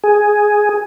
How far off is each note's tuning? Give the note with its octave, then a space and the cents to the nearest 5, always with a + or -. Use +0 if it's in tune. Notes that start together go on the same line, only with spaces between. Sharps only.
G#4 +5